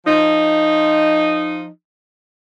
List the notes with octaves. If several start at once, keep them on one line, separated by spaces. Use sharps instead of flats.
F3 D#4